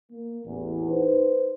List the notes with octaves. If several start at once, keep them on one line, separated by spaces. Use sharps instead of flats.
A#3
A1 E2
D#4 B4 C5